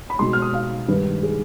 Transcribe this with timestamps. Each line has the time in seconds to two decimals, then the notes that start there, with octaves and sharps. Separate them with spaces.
0.10 B5
0.19 B2 G#3 C6
0.33 F6
0.42 D#6
0.54 F5
0.88 G2 D#3 G#3 B4
1.23 G#4